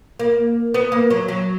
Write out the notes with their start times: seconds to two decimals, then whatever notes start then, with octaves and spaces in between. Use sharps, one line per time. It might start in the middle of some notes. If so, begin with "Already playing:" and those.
0.19 A#3
0.74 B3
0.92 A#3
1.10 F#3
1.28 F#3